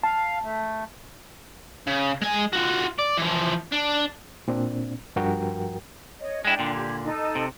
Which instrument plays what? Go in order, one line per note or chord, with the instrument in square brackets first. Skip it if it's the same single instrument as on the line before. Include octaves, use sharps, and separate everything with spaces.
[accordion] F5 [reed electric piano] A5
[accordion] A3
[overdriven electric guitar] C#3
G#3 G#5
F4 F#4
D5
E3 F3
D4
[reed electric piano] A#2 C4 D4
G2 F3 F#4 A#4 G5
[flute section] C#5 D#5
[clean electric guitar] G#3 E4 [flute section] D4 G5
[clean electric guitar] A#2 D3
[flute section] G4 G#6
D#4 A4 D#5
[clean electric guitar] C3